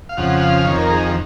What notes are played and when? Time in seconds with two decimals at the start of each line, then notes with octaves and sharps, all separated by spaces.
0.09 F5
0.17 F2 C#3 F3 F#5
0.41 F5
0.65 F2 D#3 C#5
0.78 A#4
0.90 G#4